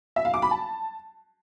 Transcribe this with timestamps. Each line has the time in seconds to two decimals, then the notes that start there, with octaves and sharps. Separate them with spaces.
0.16 E5
0.25 F5
0.34 D6
0.42 B5
0.51 A5